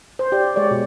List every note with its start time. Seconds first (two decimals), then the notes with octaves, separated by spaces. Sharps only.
0.19 C5
0.32 G4 D5
0.56 G#3 C#5 D5
0.71 B2